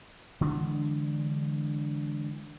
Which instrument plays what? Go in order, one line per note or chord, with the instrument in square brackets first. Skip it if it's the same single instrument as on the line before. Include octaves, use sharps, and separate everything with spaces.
[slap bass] D3 E3 G#3 D4